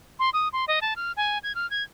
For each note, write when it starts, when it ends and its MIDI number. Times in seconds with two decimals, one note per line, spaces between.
0.19 0.30 84
0.33 0.48 87
0.53 0.65 84
0.68 0.79 75
0.81 0.94 81
0.96 1.12 89
1.17 1.38 80
1.43 1.55 92
1.55 1.69 89
1.70 1.83 92